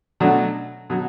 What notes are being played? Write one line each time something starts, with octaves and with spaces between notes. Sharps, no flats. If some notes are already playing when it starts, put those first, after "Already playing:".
B2 F#3 A3 D4
B2 F#3